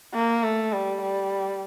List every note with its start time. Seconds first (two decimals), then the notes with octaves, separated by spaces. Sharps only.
0.14 A#3
0.44 A3
0.73 G3
1.02 G3